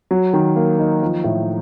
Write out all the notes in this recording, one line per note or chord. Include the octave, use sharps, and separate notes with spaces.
F#3
D#3
A#3
D#4
F3
A2